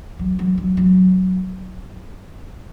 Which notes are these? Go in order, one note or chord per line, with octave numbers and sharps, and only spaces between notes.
F#3
F#3
F#3
F#3